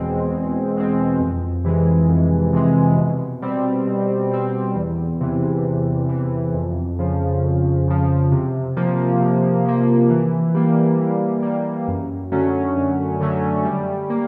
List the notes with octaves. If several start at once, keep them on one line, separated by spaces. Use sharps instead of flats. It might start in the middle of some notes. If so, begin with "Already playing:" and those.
Already playing: E2 B2 G#3 C4
E2
B2 G#3 C4
F2
C3 E3 G#3
F2
C3 E3 G#3
B2
G3 C4
B2
G3 C4
E2
C3 E3
E2
C3 E3
F2
C#3 F3
F2
C#3 F3
C3
F3 A#3
C3
F3 A#3
E3
G3 A#3
E3
G3 A#3
F#2
D3 F#3 A3 C#4
F#2
D3 F#3 A3 C#4
G3
A#3